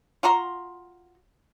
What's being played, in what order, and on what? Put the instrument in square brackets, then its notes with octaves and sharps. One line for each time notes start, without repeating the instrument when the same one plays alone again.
[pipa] F4 F#4 A#5 C6